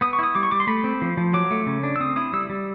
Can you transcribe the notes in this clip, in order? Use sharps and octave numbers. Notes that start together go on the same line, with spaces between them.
B3 D#6
C#6
E4 D#6
G3 D6
C#6
G3 D6
C6
A3 B5
C4
F3
F3
F#3 D6
A3
C#3
D4
E6
C4 D#6
E4 D#6
G3 E6
G3